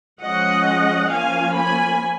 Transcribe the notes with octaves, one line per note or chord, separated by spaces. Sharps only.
F3 G#3 C#4 D#5 F#5
F3 A#3 C#4 F5 G#5
G#5 B5